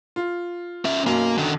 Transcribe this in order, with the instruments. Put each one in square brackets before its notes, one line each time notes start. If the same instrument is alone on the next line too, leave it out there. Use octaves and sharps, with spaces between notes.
[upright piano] F4
[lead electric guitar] C#4 E5
[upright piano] B1 F#2 [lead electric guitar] A#3
[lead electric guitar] D3 D#3